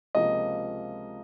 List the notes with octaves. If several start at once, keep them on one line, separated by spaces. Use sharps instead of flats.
C#2 C3 F3 A#3 D#5